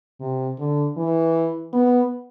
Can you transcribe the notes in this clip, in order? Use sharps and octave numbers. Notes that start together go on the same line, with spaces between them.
C3
D3
E3
B3